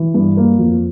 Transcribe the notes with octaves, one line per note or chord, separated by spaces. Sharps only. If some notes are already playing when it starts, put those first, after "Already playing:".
Already playing: E3
G2
A#3
F2